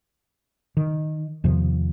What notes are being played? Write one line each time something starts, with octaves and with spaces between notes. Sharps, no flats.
D#3
E2 C3 D#3 F3